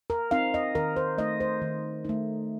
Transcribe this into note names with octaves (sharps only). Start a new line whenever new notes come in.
A#4
C4 D#4 F5
D#5
D#3 A#4
C5
A3 D#4 D#5
C5
D#3
A3 D#4